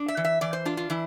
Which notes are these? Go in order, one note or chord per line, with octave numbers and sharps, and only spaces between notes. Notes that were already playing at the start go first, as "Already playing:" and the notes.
Already playing: D4
E5
E3
E5
E3 D5
C5
D4 F4
F4
E3 E4